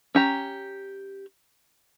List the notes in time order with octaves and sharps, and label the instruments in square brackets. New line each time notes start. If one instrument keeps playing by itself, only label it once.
[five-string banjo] C#4 G4 A#5